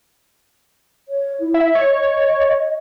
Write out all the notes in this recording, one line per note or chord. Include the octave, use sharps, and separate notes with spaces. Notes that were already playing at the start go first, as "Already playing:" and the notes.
C#5
E4
E5
C#5 D#5